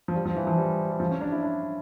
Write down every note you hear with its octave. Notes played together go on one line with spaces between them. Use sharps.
F3
G3
F3
E3
F3
G3
G3
F3
C#4
D4
E4
D4